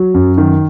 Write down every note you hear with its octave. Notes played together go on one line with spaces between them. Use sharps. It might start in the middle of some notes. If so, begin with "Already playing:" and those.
Already playing: F#3
F#2
D#3